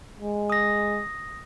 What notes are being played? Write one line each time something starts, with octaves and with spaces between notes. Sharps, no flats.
G#3
D#6 A#6